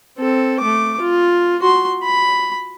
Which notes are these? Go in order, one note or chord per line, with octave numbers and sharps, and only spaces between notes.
C4 A4
A3 D6
F4
F#4 C6
B5